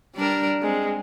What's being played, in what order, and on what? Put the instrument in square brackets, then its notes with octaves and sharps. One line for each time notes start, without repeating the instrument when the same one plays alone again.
[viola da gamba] G3 D4 A#4
[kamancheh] G#3 [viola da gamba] C4